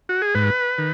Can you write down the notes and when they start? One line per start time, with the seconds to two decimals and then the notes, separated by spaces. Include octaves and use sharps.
0.09 F#4
0.22 G#4
0.35 G#2 B4
0.78 D#3